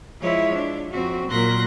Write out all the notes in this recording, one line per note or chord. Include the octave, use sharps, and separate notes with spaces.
F3 G#3 E4 C#5
D4
F2 C4 F#4
A#2 F#3 A#4 C6 F#6 A#6